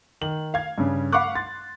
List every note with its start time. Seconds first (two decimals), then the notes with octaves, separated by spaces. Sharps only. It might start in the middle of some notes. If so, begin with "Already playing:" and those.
0.21 D#3 F#7
0.54 F5 G#6
0.78 G2 C#3
1.13 F5 F#5 B5 C#6 D6 F#6
1.35 C6 A6